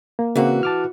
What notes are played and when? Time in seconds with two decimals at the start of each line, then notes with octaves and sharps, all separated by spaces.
0.19 A#3
0.36 C#3 E3 A#3 C4 F#4
0.63 A5 D6 F6